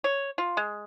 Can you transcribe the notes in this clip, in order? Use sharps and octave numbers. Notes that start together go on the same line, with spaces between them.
C#5
F4
G#3